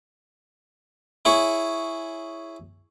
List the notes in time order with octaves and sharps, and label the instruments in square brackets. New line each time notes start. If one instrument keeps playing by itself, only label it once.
[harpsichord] E4 G#4 C#5